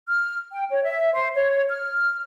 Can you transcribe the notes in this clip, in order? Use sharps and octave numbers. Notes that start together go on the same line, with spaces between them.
F6
G5
C#5
E5
C5
C#5
F6